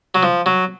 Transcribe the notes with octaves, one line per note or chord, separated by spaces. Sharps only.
F#3
F3
F#3